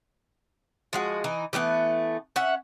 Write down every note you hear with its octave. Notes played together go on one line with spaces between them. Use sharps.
F3 G#3 F#4
E3 D#4
E3 G3 A3 B3
C#4 E5 F#5